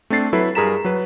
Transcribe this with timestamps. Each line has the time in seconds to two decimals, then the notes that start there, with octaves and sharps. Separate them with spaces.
0.10 A3 C4 D4 A6 C7
0.33 F#3 E4 A4 B4
0.55 G2 G#4 A#4 A#5 B6 E7
0.84 F#3 B4